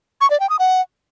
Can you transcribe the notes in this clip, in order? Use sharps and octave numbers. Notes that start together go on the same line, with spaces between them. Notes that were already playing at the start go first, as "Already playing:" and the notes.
C#6
D5
G5
D#6
F#5